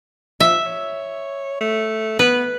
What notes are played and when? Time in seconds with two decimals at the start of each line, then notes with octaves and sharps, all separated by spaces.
0.40 F3 E5
0.66 C#5
1.61 A3
2.19 B3 B4